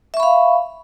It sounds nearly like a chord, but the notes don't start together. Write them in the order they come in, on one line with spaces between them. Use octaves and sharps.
E5 C#6 B5 F5